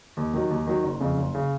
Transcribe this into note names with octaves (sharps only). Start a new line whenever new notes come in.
D#2
D#3 F#3
D#2
D#3 F#3
F#1
F2 C#3
F#1
C#3